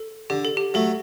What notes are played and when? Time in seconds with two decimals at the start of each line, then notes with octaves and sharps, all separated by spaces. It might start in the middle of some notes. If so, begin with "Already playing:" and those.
Already playing: A4
0.30 D3 G4
0.45 A4
0.57 G4
0.74 F#3 A3 A4